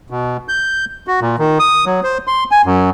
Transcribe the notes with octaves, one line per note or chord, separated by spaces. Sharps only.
B2
G6
F#4
A#2
D#3
D#6
F#3
C5
C6
G#5
F#2